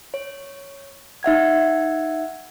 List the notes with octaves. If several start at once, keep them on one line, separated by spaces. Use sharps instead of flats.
C#5
D#4 E5 F#5 G#6